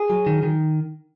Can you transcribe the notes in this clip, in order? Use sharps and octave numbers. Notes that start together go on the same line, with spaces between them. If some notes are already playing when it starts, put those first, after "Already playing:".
Already playing: G#4
F#3
D#3
D#3